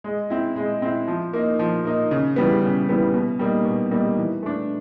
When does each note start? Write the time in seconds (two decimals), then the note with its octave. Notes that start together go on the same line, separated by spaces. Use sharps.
0.04 G#3
0.30 C4 E4
0.56 G#3
0.82 C4 E4
1.07 F3
1.33 A#3 D#4
1.59 F3
1.85 A#3 D#4
2.11 C#3
2.36 E3 G3 B3
2.62 C#3
2.89 E3 G3 B3
3.14 B2
3.39 G3 A#3 D#4
3.65 B2
3.91 G3 A#3 D#4
4.17 E3
4.42 A3 D4